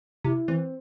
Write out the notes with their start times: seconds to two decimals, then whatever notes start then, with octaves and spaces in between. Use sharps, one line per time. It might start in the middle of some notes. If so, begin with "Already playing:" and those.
0.24 C3 E4
0.48 E3 C4